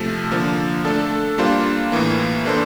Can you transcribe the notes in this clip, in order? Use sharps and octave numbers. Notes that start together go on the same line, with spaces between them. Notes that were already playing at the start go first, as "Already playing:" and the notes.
Already playing: C3 F3 A3
D3 F3 A#3
A3 D4 A4
G3 A#3 D4 F4 C5
A2 E3 A#3
E3 A#3 D4 A4 C5